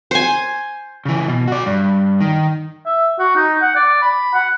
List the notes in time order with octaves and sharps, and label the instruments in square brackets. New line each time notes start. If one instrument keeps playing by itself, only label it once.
[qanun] C5 G#5
[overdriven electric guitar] C#3 E3
B2
F#4 D5
G2
D#3
[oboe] E5
F#4
D#4
F#5
D5
B5
F#5